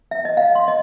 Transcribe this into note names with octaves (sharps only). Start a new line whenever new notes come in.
E5
D#5
F5
C6
D#5